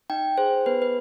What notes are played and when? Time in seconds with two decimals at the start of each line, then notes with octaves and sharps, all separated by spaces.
0.10 D#4 G5
0.38 G#4 C5
0.66 B3 B4
0.82 B4